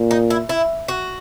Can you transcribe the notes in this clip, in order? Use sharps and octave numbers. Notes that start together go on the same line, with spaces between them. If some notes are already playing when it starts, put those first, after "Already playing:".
Already playing: A#2
D#4
E4
E4
F#4